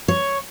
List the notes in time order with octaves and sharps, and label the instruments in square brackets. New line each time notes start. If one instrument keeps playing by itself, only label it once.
[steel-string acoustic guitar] C#5